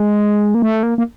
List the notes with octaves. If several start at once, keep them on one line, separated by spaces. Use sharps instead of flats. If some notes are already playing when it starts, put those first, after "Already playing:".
Already playing: G#3
A#3
A3
A#3
A#3